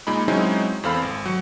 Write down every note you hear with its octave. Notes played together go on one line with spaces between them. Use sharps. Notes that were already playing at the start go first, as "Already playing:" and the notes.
A#2 G#3 D#4 B5
F#3 G#3 C4 C#4 D#4 E4
E2 C4 A4 F5 B5
G#1
F#3 C#7